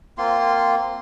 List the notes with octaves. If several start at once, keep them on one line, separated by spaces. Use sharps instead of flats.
A#3 C4 F4 C6